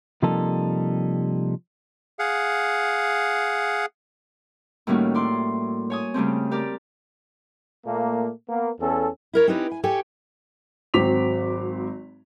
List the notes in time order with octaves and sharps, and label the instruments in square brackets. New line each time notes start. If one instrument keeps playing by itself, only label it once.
[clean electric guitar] C3 F3 G3 A#3 D#4 A4
[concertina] G#4 F5 F#5
[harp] A2 D#3 G3 A#3 C#4 F#4
E4 D5 C6
C#5 G#5 D#6
C#3 G3 A3 C4
G4 A#4 D5
[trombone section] A#2 A3 A#3
A#3 B3
E2 C#4 A4
[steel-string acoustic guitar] E4 A#4 C#5
C4 C#4 D#4 G4 B4 C#5
G#5
G4 A4 C#5 G5 G#5
[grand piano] G#1 F#3 C4 D6 B6 F7